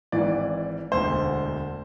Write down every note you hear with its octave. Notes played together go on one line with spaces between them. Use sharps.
G#1 G#2 E3 D5
E1 D2 D3 C5